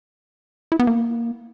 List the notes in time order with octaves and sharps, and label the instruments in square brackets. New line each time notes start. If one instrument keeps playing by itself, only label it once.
[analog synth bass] E4
B3
A#3